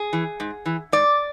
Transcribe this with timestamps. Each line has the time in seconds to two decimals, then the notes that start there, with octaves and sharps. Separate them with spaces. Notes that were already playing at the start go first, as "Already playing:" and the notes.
Already playing: G#4
0.13 E3
0.40 G#2
0.66 E3
0.92 G#2 D5